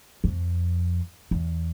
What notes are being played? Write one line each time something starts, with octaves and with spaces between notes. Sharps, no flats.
F2
E2